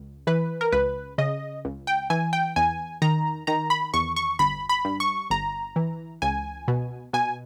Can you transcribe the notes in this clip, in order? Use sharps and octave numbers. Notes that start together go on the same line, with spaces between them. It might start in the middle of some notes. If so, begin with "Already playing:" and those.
Already playing: C#2
E3 B4
A#4
C#2 B4
C#3 D#5
C#2
G5
E3 G#5
G5
E2 G#5
D#3 A#5
D#3 A#5
B5
E2 C#6
C#6
G1 B5
B5
G2
C#6
G1 A#5
E3
C#2 G#5
B2
B2 G#5